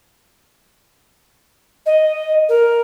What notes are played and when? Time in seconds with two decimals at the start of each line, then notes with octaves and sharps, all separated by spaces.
1.86 D#5
2.49 A#4